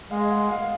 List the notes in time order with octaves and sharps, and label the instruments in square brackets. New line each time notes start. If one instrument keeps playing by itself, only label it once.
[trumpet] G#3 [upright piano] F5
[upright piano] F#5
F5